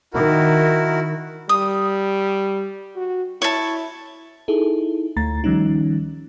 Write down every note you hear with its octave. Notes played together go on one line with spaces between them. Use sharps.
D#3 E4 F#4 A#4
G3 D#6
F#4
E4 C#5 A5
D#4 E4 G#4 A4
D2 A3 A#5 A6
D#3 F3 G3 C#4 D#4